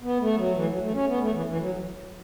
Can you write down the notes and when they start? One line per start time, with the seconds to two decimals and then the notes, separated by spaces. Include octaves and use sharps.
0.02 B3
0.20 A3
0.37 F#3
0.55 E3
0.63 A3
0.68 F#3
0.81 A3
0.94 C#4
1.07 B3
1.20 A3
1.33 E3
1.46 E3
1.59 F#3